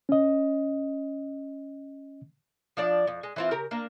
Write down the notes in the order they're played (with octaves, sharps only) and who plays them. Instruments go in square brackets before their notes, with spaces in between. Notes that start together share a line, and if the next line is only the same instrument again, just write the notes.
[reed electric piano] C#4 D#5
[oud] F3 D4 D5
F2
G#3
E3 C4 F4
C#3 G4 A#4
A#3 D4